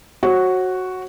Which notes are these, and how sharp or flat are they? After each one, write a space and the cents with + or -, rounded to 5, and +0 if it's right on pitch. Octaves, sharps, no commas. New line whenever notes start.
F#4 +0 C#5 -45